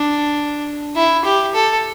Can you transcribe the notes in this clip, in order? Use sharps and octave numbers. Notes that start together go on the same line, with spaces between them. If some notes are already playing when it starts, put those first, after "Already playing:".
Already playing: D4
E4
G4
A4